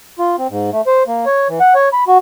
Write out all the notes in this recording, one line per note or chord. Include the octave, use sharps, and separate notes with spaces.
F4
C4
G#2
A3
C5
A#3
C#5
E3
F#5
C#5
B5
F#4